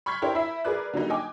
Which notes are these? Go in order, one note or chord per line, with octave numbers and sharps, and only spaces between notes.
B5 C#6 F6 G6 G#6 B6
D4 E4 G4 A#4 C5 C#5
E4 E5
G#4 A#4 B4 D5 F#6
D3 F#3 G3 A#3 D#4
D#5 G5 G#5 D6